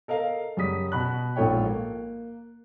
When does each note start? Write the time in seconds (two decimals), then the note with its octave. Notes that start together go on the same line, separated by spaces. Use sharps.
0.08 A4 A#4 D#5 F5
0.57 F#2 C#3 G3 D#6 B6
0.92 B2 B5 F#6
1.36 A#1 G#2 F4 A4 C#5 G5
1.66 A#3